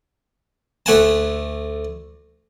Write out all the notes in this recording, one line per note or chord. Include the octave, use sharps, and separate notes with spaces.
D2 A3 F#5 G#5 A5